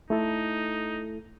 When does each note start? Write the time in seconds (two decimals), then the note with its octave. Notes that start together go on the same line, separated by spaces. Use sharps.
0.10 A3 D#4 E4 A4